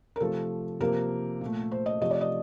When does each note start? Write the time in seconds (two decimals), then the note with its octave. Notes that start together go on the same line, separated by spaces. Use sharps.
0.16 A#4
0.20 C3 F3 A3 A4
0.80 C3 F3 A#3 A#4
1.41 A#2 A3
1.71 C5
1.86 D#5
2.01 C3 F3 A3 D#5
2.11 D5
2.21 D#5